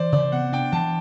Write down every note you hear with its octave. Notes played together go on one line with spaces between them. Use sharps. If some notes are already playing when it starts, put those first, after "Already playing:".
Already playing: E3 C5 D5
C3 D5
B3 F#5
D4 G5
E3 A5